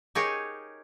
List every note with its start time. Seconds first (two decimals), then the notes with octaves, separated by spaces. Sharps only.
0.15 D#4 G4 G#4 A#4 C#5